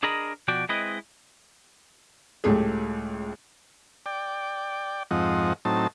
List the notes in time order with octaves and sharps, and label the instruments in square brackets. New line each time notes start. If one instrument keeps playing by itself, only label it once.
[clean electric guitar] D4 G#4 A#4 D#5 A#5 B5
B2 F3 F#4 D5 G5
G#3 C4 E4 B4 D#5
[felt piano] C#2 A2 A3 G4 G#4
[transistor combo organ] D5 G5
F2 G#2 F3 C4 D#5 F#5
A2 F#3 C4 D#4 A5